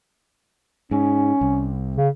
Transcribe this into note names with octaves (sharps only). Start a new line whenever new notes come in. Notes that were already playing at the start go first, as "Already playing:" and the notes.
G#2 C#4
C2
C#3